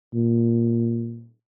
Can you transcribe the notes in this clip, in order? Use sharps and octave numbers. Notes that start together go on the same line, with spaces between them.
A#2